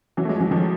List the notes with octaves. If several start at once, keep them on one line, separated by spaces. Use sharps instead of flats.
E3 F#3
A3
F#3 G#3
F3
E3 F#3
D#3 F3